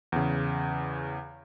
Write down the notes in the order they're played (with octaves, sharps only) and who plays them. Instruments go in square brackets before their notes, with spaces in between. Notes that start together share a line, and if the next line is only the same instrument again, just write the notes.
[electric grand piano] E2 C#3